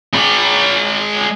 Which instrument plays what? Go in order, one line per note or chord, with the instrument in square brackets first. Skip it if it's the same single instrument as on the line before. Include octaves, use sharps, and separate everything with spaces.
[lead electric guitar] G#3 B5